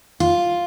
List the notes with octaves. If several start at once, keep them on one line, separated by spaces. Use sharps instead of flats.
F4